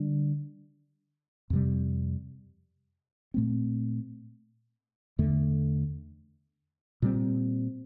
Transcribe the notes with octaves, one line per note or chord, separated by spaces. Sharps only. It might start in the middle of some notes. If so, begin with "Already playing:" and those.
Already playing: D3 G3 D4
F2 C3 G3
A#2 A3 C4
E2 D3 A3
A#2 G3 C4